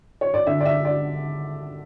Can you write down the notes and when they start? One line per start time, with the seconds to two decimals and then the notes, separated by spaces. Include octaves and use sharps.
0.21 C#5
0.34 D5
0.47 D3 E5
0.60 D5
0.65 E5
0.85 D5